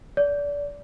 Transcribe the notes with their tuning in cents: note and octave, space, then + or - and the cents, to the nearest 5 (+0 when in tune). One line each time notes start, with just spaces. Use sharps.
D5 -25